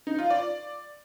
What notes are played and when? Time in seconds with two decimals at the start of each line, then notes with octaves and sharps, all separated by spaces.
0.07 D#4
0.19 F4
0.30 D5